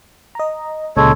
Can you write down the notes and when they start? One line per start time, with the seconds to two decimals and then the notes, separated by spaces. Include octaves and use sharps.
0.35 D#5 A#5
0.97 C#2 A#2 C#3 G#3 A4 C#5